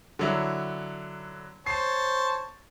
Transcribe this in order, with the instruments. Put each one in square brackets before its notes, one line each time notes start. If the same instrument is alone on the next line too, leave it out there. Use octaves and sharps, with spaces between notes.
[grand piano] D3 F#3 E4
[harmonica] C5 C#5 A5 [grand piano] C7